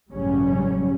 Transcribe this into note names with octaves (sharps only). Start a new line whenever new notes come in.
A1 G2 C#3 F#3 G3 C#4